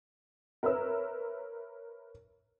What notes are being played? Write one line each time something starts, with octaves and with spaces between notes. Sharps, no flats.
A#4 B4 C#5 E5 E6